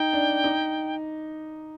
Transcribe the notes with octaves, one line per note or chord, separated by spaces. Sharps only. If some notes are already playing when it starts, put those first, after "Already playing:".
Already playing: D#4 G5
D4
D#4